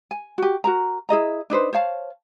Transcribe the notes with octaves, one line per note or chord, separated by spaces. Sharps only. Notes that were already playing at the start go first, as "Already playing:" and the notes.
G#5
F#4 G4
F#4 A#4 A#5
E4 G#4 D#5 A#5
D4 D#4 B4 C5
C5 C#5 F5 A5